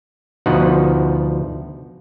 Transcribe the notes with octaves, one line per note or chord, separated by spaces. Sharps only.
D2 B2 F3 D#4 F#5